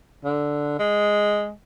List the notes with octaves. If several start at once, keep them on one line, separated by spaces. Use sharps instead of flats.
D3
G#3